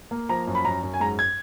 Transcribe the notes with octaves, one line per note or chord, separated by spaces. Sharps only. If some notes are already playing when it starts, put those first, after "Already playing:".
A#3
F3 A#5
F#2
B5
F#2 A#5
F#2
G#5
G#2 A#5
G#6